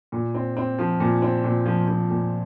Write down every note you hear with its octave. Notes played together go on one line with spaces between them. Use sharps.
A#2
C4
C4
F3
A#2
C4
A#2
F3
F3
A#2